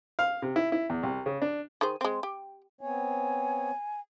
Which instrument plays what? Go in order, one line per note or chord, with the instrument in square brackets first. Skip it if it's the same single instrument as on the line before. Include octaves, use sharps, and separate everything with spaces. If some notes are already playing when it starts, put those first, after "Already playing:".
[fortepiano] F5
C3
E4
E4
E2
C2
C#3
D4
[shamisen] D#3 G#4 C5
G#3 C4
G4
[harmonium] B3 C4 C#5 [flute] G#5